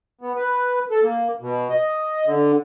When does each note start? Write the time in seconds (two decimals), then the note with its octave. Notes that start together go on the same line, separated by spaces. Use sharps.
0.21 B3
0.36 B4
0.91 A4
1.03 A#3
1.41 B2
1.70 D#5
2.26 D3